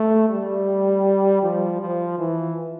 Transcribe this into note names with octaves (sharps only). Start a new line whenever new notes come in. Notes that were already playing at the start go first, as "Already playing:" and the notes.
Already playing: A3
G3
F3
F3
E3